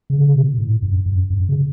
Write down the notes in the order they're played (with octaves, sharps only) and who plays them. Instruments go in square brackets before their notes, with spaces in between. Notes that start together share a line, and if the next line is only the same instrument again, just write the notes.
[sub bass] C#3
D3
C#3
B2
A2
F#2
F#2
F#2
C#3